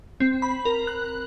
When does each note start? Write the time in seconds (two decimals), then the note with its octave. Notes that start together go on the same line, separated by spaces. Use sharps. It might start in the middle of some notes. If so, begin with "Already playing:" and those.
0.20 C4
0.42 B5
0.65 A#4
0.87 F#6